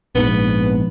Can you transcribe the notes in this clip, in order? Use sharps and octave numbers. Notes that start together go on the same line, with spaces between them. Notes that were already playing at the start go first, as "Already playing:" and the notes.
A#1 G#2 B3